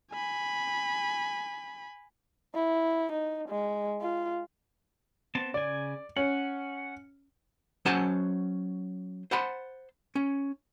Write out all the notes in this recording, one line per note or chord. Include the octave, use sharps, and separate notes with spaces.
G#5 B5
E4
D#4
G#3
F4
B3 C4 A5
C#3 D5 G#5
C#4 F#5
F#3 C#4 C5 F#5 G#5 A5
C5 F#5 A5 B5 C6
C#4